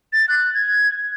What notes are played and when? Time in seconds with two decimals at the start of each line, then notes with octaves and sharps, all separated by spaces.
0.13 A6
0.28 F#6
0.55 G#6